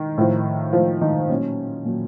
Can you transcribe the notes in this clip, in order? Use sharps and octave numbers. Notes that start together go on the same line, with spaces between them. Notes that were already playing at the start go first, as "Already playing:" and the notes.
Already playing: D#3
A2 F3
A2 F3 F4
D#3 D#4
A#2 F#3 C#4
A#2 F#3